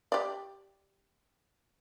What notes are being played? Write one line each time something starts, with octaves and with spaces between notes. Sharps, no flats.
G4 D5